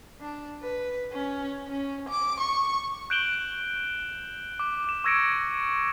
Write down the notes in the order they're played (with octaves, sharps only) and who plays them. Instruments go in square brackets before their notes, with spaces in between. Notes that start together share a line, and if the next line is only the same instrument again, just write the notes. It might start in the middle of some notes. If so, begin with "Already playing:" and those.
[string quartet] D4
B4
C#4
C#4
D6
C#6
[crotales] F#6 G6 D7 E7 F#7 G7
D6
D6 E7
C#6 E6 G#6 A#6 C#7 D7